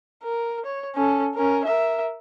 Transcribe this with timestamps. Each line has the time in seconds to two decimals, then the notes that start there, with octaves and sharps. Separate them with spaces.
0.23 A#4
0.65 C#5
0.95 C#4 A4
1.35 C#4 A#4
1.65 A#4 E5